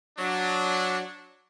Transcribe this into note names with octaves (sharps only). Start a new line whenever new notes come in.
F#3 D4